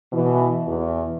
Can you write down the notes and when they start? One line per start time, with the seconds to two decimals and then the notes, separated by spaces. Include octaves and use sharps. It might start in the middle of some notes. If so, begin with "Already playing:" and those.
0.12 B2 E3
0.68 E2